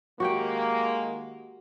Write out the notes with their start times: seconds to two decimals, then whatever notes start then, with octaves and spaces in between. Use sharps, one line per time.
0.20 D#3 G#3 A#3 F#4 G4 G5